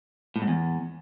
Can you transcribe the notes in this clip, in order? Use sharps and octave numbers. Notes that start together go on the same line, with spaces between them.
A2
G#2
E2